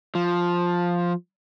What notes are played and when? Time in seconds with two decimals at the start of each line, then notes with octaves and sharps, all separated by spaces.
0.15 F3